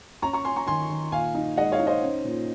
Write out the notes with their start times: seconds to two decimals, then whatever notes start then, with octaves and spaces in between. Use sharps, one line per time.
0.22 C#4 A#5 C#6
0.33 A#5 C#6
0.45 C#4 G#5 C6
0.56 A#5 C#6
0.67 D#3 G#5 C6
0.90 D#3
1.12 A#2 F5 G#5
1.35 D#4
1.57 G#3 D#5 F#5
1.72 C#5 F5
1.80 D#4
1.87 C5 D#5
2.02 C#4
2.25 A#2